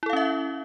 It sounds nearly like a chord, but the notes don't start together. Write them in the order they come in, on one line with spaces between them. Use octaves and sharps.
E4 A4 F5 C#4 E5